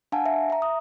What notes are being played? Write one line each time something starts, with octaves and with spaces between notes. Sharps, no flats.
D4 F5 F#5 G#5 A5
E5
E5 A#5
D#6